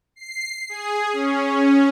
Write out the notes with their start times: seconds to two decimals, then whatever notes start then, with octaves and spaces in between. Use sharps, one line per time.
0.16 C7
0.69 G#4
1.13 C#4